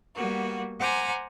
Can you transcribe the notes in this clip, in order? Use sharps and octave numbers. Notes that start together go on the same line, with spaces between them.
G3 A#3 B3 F#4
C5 F#5 G#5 A#5 B5 D6